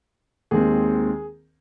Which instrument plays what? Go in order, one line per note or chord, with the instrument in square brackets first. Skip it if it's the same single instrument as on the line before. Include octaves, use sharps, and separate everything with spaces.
[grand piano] D#2 D#3 G#3 C4 G#4